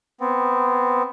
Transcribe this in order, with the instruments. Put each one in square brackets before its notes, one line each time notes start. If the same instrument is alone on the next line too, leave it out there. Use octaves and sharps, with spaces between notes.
[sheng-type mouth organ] B3 C4